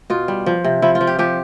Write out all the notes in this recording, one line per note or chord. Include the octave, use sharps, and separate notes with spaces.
B2 F4
G3
F3
C3
F3 E4
F4
F3
G4
F3 G4